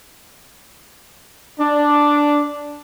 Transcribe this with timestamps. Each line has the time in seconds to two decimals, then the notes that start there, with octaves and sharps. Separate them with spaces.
1.59 D4